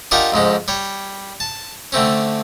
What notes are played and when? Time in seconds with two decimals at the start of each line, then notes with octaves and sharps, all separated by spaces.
0.11 D4 D#4 F4 G4 A#4 F#5
0.32 F2 G#2 G#3 C#4
0.68 G3 C#5
1.40 A5
1.92 D3 A3 C4 C#4